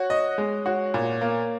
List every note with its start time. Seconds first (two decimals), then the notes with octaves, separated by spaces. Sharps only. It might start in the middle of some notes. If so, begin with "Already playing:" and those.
Already playing: F#4 C#5
0.10 D#5
0.38 G#3
0.66 F#4 C#5
0.94 A#2
1.21 A#3